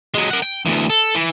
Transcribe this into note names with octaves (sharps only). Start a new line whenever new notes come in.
F#3 G#3
A#4 F#5
G5
D2 E3
A4
E3